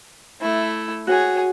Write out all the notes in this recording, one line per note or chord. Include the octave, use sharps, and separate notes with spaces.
A3 E4
F#4 G#4 C#5